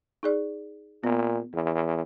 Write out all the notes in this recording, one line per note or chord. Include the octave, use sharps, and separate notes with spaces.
D#4 G#4 D5
A#2 B3
E2